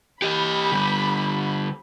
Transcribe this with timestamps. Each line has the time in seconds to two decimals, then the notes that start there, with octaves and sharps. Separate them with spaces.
0.22 G4 D#5 B5
0.72 D3 G3